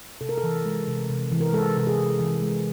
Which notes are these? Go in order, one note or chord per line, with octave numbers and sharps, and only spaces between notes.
C3 A4
A#4
A4
E3
G#3
C3
C3
E3
A#4
G#3 A4
C3 A4
G#4
C3
E3
G#3